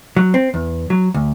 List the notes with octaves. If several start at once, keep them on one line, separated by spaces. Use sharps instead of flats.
F#3
C4
E2
F#3
D2